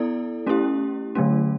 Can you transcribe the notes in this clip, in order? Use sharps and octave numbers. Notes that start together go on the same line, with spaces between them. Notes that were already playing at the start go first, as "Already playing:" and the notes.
Already playing: B3 E4 A4 D5
A3 C#4 E4 G4
D3 F#3 A3 C#4